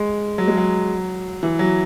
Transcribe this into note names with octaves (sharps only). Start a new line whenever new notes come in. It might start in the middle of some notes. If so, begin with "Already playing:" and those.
Already playing: G#3
F#3
G#3
F#3
E3
F#3